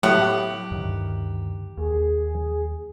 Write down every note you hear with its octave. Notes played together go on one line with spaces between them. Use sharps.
A2 F#3 B3 G4 F#5
D2 G2 D#3
D#2 G#4